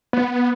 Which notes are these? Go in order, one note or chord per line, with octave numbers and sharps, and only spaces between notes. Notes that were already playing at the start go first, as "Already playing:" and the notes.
B3